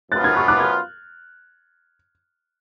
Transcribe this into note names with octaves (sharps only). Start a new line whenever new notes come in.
F#2 F3 B3 F4 B4 F#6 A6
F6 G#6
C#6 F6
D6 F#6
F6 G#6